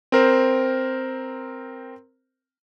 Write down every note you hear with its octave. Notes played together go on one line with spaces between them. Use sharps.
C4 A#4 C5